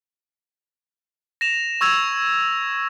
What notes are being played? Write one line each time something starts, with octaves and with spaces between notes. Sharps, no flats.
A#6 E7 F7
C#6 E6 G#6 F7